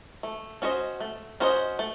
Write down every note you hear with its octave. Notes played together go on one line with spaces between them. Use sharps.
A3
C#4 F#4 C5 D#5
A3
C#4 F#4 C5 D#5
A3